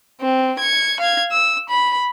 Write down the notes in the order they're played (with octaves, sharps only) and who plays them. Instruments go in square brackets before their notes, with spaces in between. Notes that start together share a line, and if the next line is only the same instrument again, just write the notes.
[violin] C4
G#6 C#7
F5 G#6
E6
B5